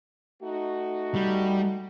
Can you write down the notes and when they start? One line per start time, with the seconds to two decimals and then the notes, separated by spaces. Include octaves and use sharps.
0.42 A3 D#4 F#4
1.15 G3